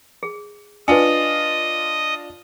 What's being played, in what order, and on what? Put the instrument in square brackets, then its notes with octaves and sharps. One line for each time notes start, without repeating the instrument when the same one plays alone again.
[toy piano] G#4
[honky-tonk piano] D4 F4 [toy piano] B4 G#5 [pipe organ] D#5